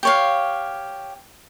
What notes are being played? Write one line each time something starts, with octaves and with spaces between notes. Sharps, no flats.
G4 C#5 F5